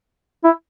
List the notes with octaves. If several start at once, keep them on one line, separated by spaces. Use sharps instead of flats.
E4